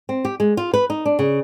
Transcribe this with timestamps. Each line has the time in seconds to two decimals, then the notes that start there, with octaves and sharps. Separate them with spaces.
0.09 C4
0.25 G4
0.40 G#3
0.57 F4
0.74 B4
0.90 D#4
1.05 D4
1.19 C#3